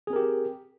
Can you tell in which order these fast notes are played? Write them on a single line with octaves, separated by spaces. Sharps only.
G#4 C4 A#4 G4